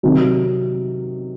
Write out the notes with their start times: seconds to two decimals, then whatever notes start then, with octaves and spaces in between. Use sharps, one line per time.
0.03 C3 D#3 F#3